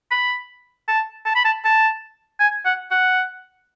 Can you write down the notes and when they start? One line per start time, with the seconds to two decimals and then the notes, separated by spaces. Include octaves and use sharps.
0.11 B5
0.88 A5
1.26 A5
1.36 B5
1.45 A5
1.65 A5
2.40 G#5
2.66 F#5
2.91 F#5